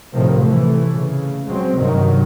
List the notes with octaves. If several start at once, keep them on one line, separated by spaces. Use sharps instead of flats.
A2 C3 D#3 F3
E3 A3
C#3
F#3 G#3 C4
G2 C3 D#3 F#3